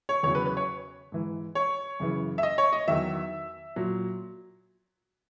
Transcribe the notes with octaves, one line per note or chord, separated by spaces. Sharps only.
C#5
E2 C#3 F#3 C#5
B4
B4
C#5
G#2 E3
C#5
F#2 C#3 E3
E5
D#5
C#5
D#5
E2 D#3 F#3 E5
A#2 F#3